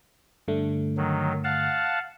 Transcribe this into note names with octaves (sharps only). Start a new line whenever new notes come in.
G2 D3 A3
D#3 F#3
F5 F#5 A5